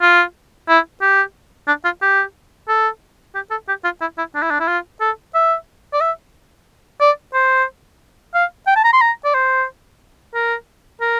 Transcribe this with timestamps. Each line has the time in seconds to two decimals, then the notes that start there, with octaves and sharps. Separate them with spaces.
0.02 F4
0.69 E4
1.02 G4
1.68 D4
1.84 F4
2.02 G4
2.68 A4
3.35 G4
3.51 A4
3.68 G4
3.84 F4
4.01 E4
4.18 E4
4.35 D4
4.42 E4
4.51 D4
4.60 E4
4.68 F4
5.01 A4
5.35 E5
5.93 D5
6.01 E5
7.01 D5
7.34 C5
8.35 F5
8.67 G5
8.76 A5
8.84 A#5
8.93 C6
9.01 A#5
9.25 D5
9.34 C5
10.34 A#4
11.01 A#4